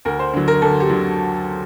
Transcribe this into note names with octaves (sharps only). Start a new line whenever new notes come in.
D2 A#4
C5
D3 F#3
A#4
D2 A4
G4
D3 F#3